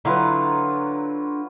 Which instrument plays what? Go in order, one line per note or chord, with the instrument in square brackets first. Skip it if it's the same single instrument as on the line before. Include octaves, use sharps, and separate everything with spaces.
[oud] D3 E4 [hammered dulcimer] F#3 F4 B4